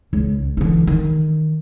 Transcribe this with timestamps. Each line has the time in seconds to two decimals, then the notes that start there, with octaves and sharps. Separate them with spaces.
0.13 C#2
0.57 D3 E3
0.87 D#3